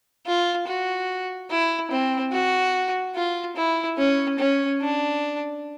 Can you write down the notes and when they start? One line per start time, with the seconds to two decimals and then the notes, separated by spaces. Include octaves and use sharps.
0.26 F4
0.67 F#4
1.50 E4
1.91 C4
2.33 F#4
3.15 F4
3.56 E4
3.98 C#4
4.39 C#4
4.81 D4